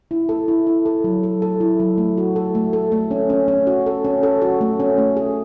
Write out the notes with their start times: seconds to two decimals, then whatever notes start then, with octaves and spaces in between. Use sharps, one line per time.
0.11 E4
0.29 A4
0.48 E4
0.67 E4
0.86 A4
1.04 F#3
1.23 A4
1.42 A4
1.60 E4
1.80 F#3
1.98 A3
2.18 F#4
2.36 A4
2.55 A3
2.73 A4
2.92 A3
3.11 C#4
3.30 C#4
3.48 C#4
3.67 F#4
3.86 A4
4.05 C#4
4.23 A4
4.42 F#4
4.61 A3
4.80 C#4
4.98 A3
5.17 G#4